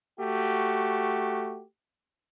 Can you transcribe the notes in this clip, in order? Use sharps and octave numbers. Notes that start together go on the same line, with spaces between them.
A3 F#4 G4